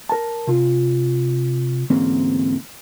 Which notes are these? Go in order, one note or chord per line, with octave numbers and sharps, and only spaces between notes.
A#4 A5
C3 F4
D2 G#2 E3 A#3 C4 C#4